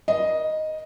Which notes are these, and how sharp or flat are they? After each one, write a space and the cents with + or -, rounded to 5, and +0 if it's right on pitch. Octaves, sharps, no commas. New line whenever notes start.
A#4 +45 D#5 +0